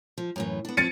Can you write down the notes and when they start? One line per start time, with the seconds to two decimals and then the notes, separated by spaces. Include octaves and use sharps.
0.18 F3
0.36 F#2 A2 E3
0.65 B3 D4
0.77 F3 C4 A6 C#7 D#7